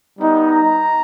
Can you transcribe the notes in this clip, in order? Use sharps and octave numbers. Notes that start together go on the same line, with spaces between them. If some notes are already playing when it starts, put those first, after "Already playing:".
G3 B3 D#4
A#5